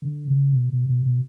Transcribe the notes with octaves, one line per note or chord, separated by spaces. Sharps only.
D3
C#3
B2
B2
B2
B2